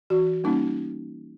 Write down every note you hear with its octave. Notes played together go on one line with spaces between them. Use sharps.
E3 F#4
G3 A#3 C#4 D#4